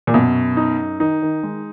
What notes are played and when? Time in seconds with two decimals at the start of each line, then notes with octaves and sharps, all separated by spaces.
0.07 A#2
0.14 F#2 B2
0.57 D#4
1.00 D#3 D#4
1.22 D#3
1.43 D#3 G#3